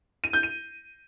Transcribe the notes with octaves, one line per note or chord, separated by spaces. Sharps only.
D#7
G6
D#7